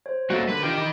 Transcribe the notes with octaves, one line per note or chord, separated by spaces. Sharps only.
C5 C#5
G3 A#3 F#4 A4
D3 A#4 B4
D4 D#4 F4 G4 G5
D#3 B5 D6